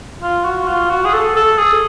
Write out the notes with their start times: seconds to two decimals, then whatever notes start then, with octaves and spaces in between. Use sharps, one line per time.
0.22 F4
0.45 F#4
0.67 F4
0.90 F#4
1.05 G#4
1.13 A4
1.36 A4
1.58 G#4